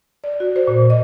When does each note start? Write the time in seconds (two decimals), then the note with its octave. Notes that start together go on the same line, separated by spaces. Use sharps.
0.24 D5
0.40 F#4
0.56 C5
0.67 A#2
0.90 D#5